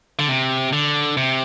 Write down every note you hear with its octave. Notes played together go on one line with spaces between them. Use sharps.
D3
C3
D3
C3